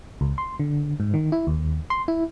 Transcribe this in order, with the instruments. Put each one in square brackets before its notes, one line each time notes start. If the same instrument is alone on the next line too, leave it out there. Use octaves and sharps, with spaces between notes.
[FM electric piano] C#2
C6
D3
G#2
D#3
E4
D#2
C6
E4